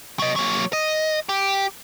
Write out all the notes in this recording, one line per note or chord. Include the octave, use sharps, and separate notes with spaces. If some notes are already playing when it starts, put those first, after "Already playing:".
F#3 D#5
F#3 A#3
D#5
G4